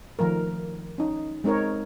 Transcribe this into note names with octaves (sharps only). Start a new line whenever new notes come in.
D#3 F3 A3 A#4
C#4 D#4
G#3 C4 D#4 A#4 C#5